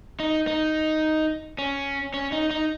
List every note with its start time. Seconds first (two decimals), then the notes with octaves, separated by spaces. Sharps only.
0.20 D#4
0.47 D#4
1.59 C#4
2.14 C#4
2.32 D#4
2.51 D#4